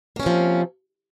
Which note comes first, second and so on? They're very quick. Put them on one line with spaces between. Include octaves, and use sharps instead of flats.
A#3 C#4 C3 F3